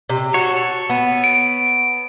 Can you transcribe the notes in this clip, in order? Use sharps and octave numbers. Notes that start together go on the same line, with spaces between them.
C3
F#4 A4 C#5
B3
D7